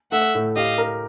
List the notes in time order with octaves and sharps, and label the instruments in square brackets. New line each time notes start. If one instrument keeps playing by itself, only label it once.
[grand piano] A3 [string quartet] E5 F#5
[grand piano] A2
[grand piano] G4 [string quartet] D#5 F5
[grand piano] A#4